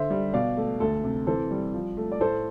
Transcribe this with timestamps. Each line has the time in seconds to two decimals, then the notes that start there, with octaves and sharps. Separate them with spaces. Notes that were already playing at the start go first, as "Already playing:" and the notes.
Already playing: D3 C5 E5
0.10 G3
0.34 B2 D5 F5
0.57 A3
0.80 D2 A4
1.04 C3
1.27 E3 A4 C5
1.51 G3
1.74 F3
1.97 A3
2.12 D5
2.20 A2 A4 C5